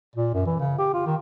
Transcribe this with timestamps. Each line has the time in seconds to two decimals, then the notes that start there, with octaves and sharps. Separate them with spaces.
0.16 A#2
0.34 F#2
0.46 E3
0.60 C#3
0.79 G4
0.94 F4
1.07 D#3